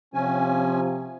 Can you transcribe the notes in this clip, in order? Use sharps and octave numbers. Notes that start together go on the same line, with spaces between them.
C3 F3 C4 C#4 G#5